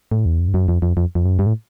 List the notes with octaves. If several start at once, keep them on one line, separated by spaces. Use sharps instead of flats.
A2
E2
F2
G2
F#2
F2
F2
F2
F2
F#2
G2
A2